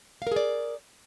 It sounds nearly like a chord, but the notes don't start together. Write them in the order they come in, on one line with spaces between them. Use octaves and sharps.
F5 A#4 G#4 D5